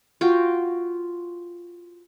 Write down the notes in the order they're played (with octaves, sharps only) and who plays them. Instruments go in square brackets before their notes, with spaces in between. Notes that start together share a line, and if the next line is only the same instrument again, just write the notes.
[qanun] F4 F#4 G5